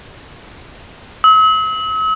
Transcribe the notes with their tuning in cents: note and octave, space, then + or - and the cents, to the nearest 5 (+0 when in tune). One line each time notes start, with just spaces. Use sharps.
E6 -45